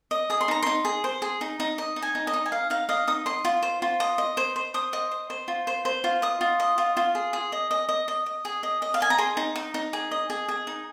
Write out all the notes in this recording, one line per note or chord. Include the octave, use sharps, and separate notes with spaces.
D#5
G#4 D#6
C6
D#4 A#5
D#4 C6
G#4
C5
G#4
D#4
D#4
D#5
D#4
G#5
D#4
D#5
D#4
G#5
D#5 F5
D#4 F5
D#5 F5
D#4 D#6
D#5 C6
F4
C5
F4
D#5
D#5
C5
C5
C5 D#6
D#5
C5
C5
F4
C5
C5
F4
D#5 D#6
F4
D#5
F4
F4
G#4
G#4
D#5
D#5
D#5
D#5
D#5
G#4
D#5
D#5
F5
D#5 G#5
A#5
G#4 C6
D#4
D#4
D#4
G#4
D#5
G#4
G#4
D#4